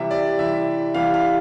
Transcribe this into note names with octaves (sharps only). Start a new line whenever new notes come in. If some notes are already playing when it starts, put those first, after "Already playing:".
Already playing: C3 E3 G3 E5
D5
C3 E3 G3 E5
C3 E3 G3 F5
F5